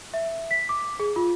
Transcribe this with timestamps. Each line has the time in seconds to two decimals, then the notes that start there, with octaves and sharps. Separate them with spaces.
0.14 E5
0.51 B6
0.69 D6
1.00 G#4
1.16 F4